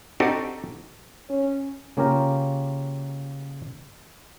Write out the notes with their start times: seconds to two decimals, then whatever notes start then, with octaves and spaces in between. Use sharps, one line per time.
0.20 C4 D4 D#4 F#4 G4 A4
1.30 C#4
1.97 C#3 A#3 C#4 F4 G4 A#4